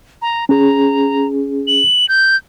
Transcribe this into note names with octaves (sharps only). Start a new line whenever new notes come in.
A#5
C#4 G#4 A#5
F#7
G6